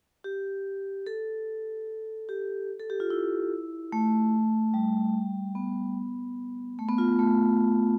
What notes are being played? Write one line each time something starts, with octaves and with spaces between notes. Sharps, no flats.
G4
A4
G4
A4
G4
F4
E4
A3
G3
B3
A3
B3
F4
A3